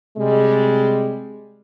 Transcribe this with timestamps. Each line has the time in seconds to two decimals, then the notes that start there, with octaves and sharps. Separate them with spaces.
0.17 C3 G3 G#3